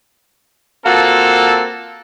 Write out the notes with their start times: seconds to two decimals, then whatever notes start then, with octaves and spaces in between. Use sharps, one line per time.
0.85 A#3 C4 F4 F#4 A4